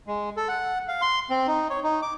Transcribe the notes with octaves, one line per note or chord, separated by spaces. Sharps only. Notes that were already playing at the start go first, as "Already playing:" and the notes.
G#3
A4
F#5
F5
C6
C4
D#4
C#5
D#4
D6